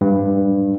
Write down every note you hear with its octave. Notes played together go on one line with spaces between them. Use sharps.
G2